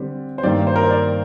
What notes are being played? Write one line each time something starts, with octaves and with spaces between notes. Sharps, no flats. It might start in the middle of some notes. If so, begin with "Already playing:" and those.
Already playing: D3 G3 C4
C5
G2 D#3 A#3 D5
C5
A#4
C5
D5